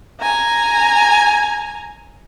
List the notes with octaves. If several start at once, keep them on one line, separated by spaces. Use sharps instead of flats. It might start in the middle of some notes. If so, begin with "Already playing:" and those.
G#5 A#5